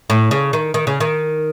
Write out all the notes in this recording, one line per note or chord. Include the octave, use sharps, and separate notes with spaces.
A2
C#3
D#3
D#3
C#3
D#3